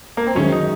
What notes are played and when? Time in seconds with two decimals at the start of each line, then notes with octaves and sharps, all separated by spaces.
0.17 A#3
0.27 C4
0.35 F#2 D#3 G#3 C#4
0.52 D#4